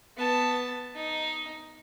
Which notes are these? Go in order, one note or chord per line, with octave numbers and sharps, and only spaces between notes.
B3 A5
D#4